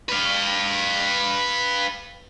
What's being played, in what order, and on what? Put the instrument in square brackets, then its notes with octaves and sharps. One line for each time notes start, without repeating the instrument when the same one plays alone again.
[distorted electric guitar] B4 F5